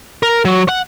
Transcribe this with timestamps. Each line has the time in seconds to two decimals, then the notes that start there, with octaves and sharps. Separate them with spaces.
0.23 A#4
0.45 F#3
0.69 F#5